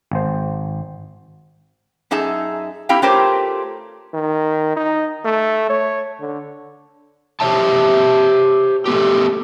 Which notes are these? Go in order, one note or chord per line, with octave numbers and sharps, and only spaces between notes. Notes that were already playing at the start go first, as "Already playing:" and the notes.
G#1 C5
F#2 D#4 G#4 E5 A5
C4 E4 G4 F5 G5
A3 F4 G4 A#4 C5 C#5
D#3
D#4
A3
C#5
D3
G4 C5 C#5 E5 A5
A3 B3 G4